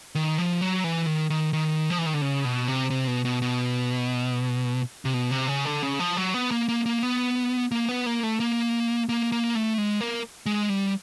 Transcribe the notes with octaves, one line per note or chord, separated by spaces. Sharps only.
D#3
F3
F#3
E3
D#3
D#3
D#3
F3
E3
D#3
D3
C#3
B2
C3
C3
B2
B2
B2
C3
B2
C3
C#3
D3
C#3
F3
F#3
B3
A#3
A#3
A#3
B3
A#3
B3
A#3
A3
A#3
A#3
A#3
A3
G#3
A#3
G#3
G3